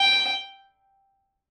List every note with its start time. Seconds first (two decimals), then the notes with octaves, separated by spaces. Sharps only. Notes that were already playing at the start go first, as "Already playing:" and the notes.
Already playing: G5